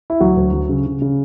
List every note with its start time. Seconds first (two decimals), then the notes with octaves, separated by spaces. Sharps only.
0.10 E4
0.20 D2 F#3 F#4
0.36 D2
0.53 F#3
0.69 C#3
0.86 C#3
1.02 C#3